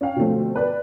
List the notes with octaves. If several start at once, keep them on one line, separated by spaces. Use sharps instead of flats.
C#4 C#5 F5 G5
B2 D3 F3 A3 C4
B4 D5